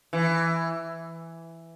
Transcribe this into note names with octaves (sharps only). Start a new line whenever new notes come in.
E3